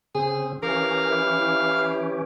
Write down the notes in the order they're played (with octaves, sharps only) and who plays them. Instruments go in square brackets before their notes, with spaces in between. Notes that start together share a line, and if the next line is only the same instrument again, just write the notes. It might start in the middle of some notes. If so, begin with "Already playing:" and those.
[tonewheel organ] C#3 C4 [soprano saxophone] G#4
[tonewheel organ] E3 C#4 G4 [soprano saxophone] A#4 [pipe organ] F5
[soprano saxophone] E4